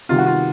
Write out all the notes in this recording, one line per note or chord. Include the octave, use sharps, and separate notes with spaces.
C3 D#3 G3 B3 F4
F#4
F4